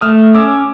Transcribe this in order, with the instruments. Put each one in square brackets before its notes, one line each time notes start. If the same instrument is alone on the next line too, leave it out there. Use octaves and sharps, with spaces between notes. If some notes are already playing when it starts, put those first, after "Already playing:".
[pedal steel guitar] A3 [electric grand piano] D#6 F6
[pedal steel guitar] C#4 [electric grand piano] D6 E6